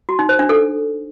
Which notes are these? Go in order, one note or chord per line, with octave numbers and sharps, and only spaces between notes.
F#4
D#4
C5
D4
A4